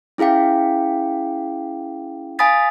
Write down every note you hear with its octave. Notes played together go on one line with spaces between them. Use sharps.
C#4 E4 G#4 F5 G5
F5 G#5 B5 D#6 A6 B6